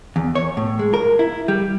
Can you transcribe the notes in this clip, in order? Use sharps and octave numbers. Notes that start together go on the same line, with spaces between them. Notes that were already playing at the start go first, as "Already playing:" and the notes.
E2
C#5
A2
G#3
A#4
E4
G3